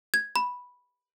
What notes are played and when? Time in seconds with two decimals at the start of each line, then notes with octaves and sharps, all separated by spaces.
0.14 G#6
0.36 B5